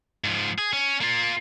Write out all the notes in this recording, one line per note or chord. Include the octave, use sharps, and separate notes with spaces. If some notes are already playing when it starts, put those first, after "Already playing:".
G#2 F3
G#4
C#4
A#3 F4